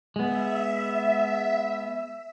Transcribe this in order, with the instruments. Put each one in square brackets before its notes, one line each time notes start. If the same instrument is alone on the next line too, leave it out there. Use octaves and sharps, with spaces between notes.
[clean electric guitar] G#3 B3 [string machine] E5